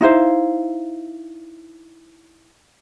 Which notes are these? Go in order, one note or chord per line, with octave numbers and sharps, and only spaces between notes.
D#4 E4 C5 F5